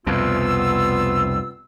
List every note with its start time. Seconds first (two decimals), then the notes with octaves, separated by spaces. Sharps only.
0.07 C2 F2 B2 B3 F4 E6